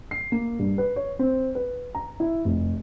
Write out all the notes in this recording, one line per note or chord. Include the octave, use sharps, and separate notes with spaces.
C7
A#3
G2
B4
C#5
C4
B4
A#5
E4
F1